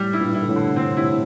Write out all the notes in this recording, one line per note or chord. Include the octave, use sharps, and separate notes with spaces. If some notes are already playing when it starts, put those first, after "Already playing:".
Already playing: A2 G3
E4
G2 A#2
E4
D3
A2 C3
D3
A2 C4
A2 C3 E4